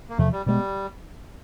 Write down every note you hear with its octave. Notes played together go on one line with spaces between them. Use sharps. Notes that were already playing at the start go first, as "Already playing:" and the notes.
A#3
E2 C3 F3 A3
G3
B2 G3 G#3 B3